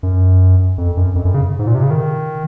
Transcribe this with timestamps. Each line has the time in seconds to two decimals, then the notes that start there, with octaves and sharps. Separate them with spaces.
0.03 F#2
0.78 F2
0.97 F#2
1.15 F2
1.25 F#2
1.34 C#3
1.59 G#2
1.67 A#2
1.75 C3
1.83 C#3
1.91 D#3